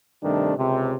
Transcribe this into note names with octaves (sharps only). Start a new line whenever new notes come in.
G2 C3 D#3 A3 D4
C#2 C3